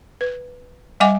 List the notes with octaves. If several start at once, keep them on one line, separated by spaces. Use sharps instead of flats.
B4
G3 D#5 F#5 G#5 D6